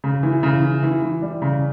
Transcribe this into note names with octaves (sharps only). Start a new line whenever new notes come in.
C#3
E3
C#3
E3
E3
E3
G3
C#3